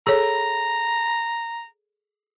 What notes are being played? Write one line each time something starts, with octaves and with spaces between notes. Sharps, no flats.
G#4 A4 C#5 A#5